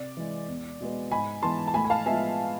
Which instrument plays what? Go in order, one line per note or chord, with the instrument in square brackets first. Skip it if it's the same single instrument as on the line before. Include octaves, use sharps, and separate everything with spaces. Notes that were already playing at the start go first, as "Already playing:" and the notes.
Already playing: [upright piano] C3 D5
E3 G#3
E2
B2 G#3 B3
G#2 G#5 B5
E3 G#3 B3 A5 C6
A5
A2 G#5 B5
G#5
F5 A5
F3 G#3 B3 E5 G#5